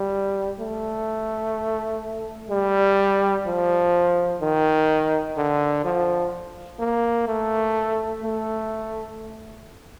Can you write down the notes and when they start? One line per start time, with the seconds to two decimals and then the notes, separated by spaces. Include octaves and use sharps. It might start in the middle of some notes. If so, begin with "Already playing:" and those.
Already playing: G3
0.60 A3
2.50 G3
3.47 F3
4.41 D#3
5.37 D3
5.84 F3
6.80 A#3
7.28 A3
8.23 A3